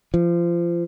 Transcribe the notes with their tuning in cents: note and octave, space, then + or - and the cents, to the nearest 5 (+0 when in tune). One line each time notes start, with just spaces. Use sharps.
F3 -30